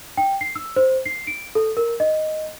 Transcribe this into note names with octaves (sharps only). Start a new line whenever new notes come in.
G5
C7
E6
C5
C7
D7
A4
A#4
D#5